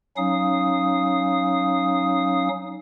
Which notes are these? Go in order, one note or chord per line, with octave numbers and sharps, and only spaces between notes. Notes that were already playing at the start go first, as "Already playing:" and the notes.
F#3 C#4 D#4 F5 D#6